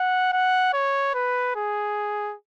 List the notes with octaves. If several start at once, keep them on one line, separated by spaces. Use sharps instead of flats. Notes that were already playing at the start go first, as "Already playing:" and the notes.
Already playing: F#5
F#5
C#5
B4
G#4